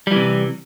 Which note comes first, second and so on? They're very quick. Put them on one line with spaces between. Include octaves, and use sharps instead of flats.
G3 E3 C3